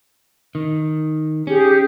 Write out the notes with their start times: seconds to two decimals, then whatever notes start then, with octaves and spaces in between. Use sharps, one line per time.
0.55 D#3
1.47 C#4 G4 G#4